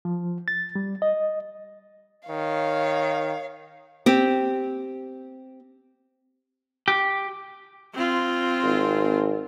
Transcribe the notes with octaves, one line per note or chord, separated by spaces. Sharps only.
F3
A6
G3
D#5
D#3 C#5 F5
C4 G4
G4
C4 F4
G#1